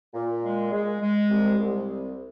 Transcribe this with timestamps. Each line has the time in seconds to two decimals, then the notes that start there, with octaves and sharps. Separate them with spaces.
0.14 A#2
0.43 G#3
0.72 G#3
1.01 G#3
1.30 C2
1.58 C2